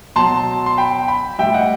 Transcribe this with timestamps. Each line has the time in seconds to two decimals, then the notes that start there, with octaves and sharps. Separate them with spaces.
0.16 B2 F#3 A5 C6
0.66 C6
0.77 G5 B5
1.07 G5 B5
1.39 A2 G3 E5 G5
1.54 D#5 F#5